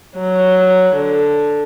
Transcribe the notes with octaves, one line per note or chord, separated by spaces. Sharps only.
F#3
D3